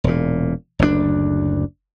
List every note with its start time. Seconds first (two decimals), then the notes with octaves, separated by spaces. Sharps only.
0.04 E1 A#2
0.79 F#1 D2 A2 D4